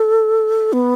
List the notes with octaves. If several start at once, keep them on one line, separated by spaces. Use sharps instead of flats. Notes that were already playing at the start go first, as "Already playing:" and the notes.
Already playing: A4
B3